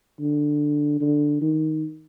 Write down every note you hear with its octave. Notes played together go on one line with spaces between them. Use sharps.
D3
D3
D#3